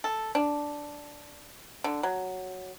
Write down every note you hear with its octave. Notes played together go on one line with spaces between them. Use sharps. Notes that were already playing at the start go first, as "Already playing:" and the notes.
A4
D4
D3
F#3